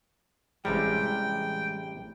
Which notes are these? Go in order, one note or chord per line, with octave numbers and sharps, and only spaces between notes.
A1 C3 G3 G#3 G5